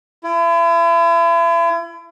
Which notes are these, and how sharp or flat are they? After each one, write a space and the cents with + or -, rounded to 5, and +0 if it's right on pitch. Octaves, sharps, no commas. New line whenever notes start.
E4 +40